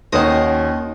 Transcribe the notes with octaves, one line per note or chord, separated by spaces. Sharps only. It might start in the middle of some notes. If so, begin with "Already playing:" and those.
D#2 D#3 C#4 D#4 F#4 C5 D#5